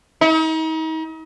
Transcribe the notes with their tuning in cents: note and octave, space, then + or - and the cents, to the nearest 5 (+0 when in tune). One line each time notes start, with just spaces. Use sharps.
D#4 +40